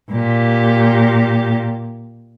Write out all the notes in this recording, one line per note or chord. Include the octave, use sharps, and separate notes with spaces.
A#2 G4